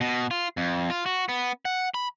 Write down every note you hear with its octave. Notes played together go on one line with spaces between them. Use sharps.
B2
F4
F2
F4
F#4
B3
F#5
B5